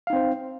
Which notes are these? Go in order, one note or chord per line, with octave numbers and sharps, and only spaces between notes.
C4 D#4 C5 F5